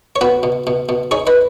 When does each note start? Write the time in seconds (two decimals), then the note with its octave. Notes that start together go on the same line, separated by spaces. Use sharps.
0.16 C#5
0.21 B3 F#4 B4
0.43 B2
0.67 B2
0.89 B2
1.11 D#4 G#4 C#5
1.27 B4 D#5